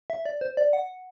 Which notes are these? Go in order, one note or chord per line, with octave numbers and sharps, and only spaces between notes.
E5
D5
C5
D5
F#5